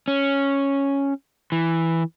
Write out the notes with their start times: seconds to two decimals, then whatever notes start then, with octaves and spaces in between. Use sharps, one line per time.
0.08 C#4
1.52 E3